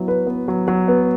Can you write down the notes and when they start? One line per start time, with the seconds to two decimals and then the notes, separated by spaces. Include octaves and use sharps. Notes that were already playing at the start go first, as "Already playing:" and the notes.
Already playing: F#3 B3 E4
0.08 B4
0.27 B3
0.48 F#3
0.68 F#3
0.88 B3